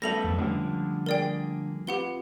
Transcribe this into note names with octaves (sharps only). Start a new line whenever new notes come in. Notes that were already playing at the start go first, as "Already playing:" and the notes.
G3 A3 B3 A4 E5 A#6 F7 F#7
F2
C#2 D3 F3 G3 A3
A#3 G#4 A#4 D5 G5
C4 F4 G4 B4 F#5 G7